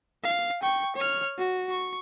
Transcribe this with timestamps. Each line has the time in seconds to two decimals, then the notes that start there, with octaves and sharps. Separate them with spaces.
0.23 F5
0.62 G5 C#6
0.96 C#5 F6
1.38 F#4
1.71 C#6